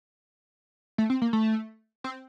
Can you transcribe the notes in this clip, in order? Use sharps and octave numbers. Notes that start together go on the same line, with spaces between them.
A3
C4
A#3
A3
C4